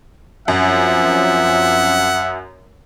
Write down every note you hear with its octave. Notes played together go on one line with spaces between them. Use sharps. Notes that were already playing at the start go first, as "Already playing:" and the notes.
F#2 F3 C4 C#4 E5 F#5